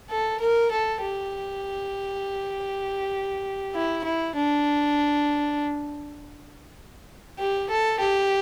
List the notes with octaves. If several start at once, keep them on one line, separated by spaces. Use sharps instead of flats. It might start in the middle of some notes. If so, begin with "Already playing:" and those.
A4
A#4
A4
G4
E4
E4
D4
G4
A4
G4